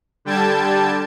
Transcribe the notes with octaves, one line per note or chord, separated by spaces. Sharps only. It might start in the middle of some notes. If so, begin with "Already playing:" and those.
D3 G3 G5 A5 G#6